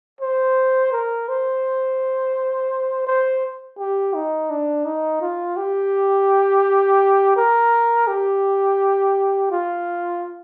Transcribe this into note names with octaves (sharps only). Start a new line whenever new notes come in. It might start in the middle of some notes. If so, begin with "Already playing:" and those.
C5
A#4
C5
C5
G4
D#4
D4
D#4
F4
G4
A#4
G4
F4